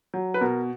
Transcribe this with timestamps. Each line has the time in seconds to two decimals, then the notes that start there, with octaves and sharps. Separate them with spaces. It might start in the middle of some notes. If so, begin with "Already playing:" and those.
0.14 F#3
0.34 B4
0.41 B2 A#4